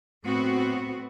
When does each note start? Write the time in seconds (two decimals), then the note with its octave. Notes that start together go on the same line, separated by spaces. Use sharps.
0.24 A2 B3 C4 F#4